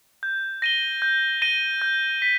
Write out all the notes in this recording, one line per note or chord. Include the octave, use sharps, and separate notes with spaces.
G6
A#6 D#7 G7
G6
A#6 D#7 G7
G6
B6